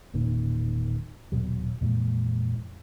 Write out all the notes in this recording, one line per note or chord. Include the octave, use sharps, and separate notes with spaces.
E1 A#2 D#3 C#4
D#1 C2 B2 F#3
F2 A#2 E3 G#3